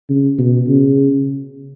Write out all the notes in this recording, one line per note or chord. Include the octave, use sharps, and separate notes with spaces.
C#3
B2
C#3